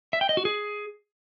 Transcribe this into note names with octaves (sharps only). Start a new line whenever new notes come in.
E5
G5
D#5
F#4
G#4